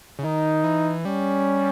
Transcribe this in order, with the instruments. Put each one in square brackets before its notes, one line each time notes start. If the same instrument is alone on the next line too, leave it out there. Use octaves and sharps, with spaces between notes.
[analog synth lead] C#3
[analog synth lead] D#3 [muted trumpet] D#4
[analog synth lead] E3
[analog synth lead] G3 [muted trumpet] C#4